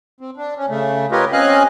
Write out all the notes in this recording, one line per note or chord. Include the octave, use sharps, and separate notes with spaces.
C4
D4
C#4
C#3 A3
F4 G4 A#4 B4 C#5 D#5
C4 C#4 D#5 F5 G#5 F#6